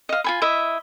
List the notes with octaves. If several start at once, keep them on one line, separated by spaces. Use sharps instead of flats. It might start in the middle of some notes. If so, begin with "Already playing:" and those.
D#5 F5
F4 G#5 B5
E4 D#5 E5